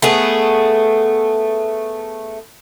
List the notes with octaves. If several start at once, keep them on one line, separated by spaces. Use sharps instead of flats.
A3 B3 G#4